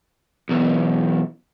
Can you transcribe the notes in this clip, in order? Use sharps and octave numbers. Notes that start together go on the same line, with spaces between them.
B1 E2